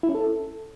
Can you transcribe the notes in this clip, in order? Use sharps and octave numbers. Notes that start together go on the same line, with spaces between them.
E4
C#4
A4